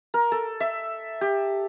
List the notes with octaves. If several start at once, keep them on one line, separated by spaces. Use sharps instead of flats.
A#4
A4
E5
G4